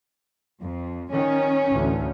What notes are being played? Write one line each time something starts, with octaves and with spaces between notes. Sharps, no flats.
F2
D#3 C#4
A1 D2